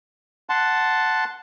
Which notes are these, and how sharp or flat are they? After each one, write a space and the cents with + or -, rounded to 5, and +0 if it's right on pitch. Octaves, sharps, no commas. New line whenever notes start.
F#5 +0 A5 +0 C6 -5